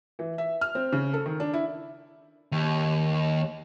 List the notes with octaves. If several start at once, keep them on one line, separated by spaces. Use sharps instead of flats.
E3
E5
F6
C4
C#3
A4
D#3
D4
E4
D#2